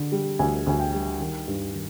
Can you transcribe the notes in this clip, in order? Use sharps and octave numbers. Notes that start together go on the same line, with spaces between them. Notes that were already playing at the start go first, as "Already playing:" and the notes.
Already playing: D3
G3
D2 G#5
D2 G#5
G5
G3
D#3
G2
D#3